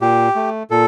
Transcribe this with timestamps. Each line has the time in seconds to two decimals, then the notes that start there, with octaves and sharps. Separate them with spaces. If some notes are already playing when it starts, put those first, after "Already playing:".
0.01 A#2 G4
0.35 A3
0.70 A#2 A4